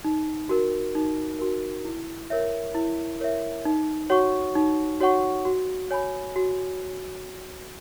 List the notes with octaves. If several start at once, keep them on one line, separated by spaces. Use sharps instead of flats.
D#4
F#4 A#4
D#4
F#4 A#4
E4
A#4 C#5 E5
E4
A#4 C#5 E5
D#4
F#4 C#5 F#5 C#6
D#4
F#4 C#5 F#5 C#6
F#4
C#5 G#5 B5
F#4